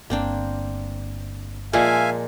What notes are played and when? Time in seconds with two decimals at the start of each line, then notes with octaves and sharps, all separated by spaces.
0.10 G1 A#3 C4 D4
1.73 A#2 F3 G#3 A#3 E5 F5 G#5